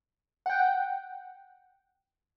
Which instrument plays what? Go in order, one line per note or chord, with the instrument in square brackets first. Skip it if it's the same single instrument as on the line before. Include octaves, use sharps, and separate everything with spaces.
[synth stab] F#5 G5